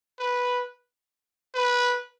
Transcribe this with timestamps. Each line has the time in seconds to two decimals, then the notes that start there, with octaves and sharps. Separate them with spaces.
0.19 B4
1.54 B4